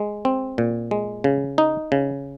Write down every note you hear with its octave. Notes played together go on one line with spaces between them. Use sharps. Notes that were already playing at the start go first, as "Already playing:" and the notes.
Already playing: G#3
C4
A#2
G#3
C#3
D#4
C#3